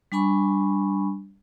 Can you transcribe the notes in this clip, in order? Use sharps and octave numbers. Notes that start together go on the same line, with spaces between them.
G3 D4 G#5 B5 C#6